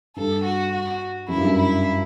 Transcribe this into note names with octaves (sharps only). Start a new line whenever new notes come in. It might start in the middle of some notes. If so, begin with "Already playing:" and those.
G2 A4
F#4
F#4
F#2 E4
G2
F#2
E4